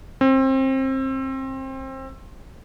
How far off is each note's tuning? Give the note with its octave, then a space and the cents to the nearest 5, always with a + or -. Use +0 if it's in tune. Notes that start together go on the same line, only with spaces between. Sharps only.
C4 +25